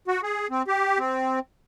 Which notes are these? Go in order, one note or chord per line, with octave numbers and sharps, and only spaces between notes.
F#4
G#4
C4
G4
C4